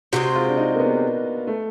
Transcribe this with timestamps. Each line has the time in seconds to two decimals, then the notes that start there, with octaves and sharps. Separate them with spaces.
0.13 C3 E3 G#3 C4 F#4
0.35 F4
0.48 D4
0.57 D#4
0.75 A#3
0.80 B3
1.47 A3